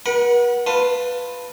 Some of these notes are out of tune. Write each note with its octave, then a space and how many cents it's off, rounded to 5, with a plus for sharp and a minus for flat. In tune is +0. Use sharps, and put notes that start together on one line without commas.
B4 -45 F#5 +0 B5 -25
F4 +0 B4 +0 A5 +25